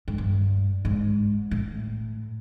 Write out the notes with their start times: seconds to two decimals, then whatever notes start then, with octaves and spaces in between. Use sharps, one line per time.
0.08 G#2
0.18 G2
0.85 G#2
1.51 A2